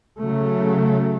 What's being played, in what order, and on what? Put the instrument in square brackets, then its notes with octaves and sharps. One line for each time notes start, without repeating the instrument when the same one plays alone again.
[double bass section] C#3 F#3 A3